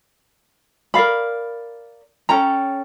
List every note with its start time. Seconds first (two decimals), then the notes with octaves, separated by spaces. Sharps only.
0.94 A#4 D5 F5 B5
2.29 C#4 A4 G5 A#5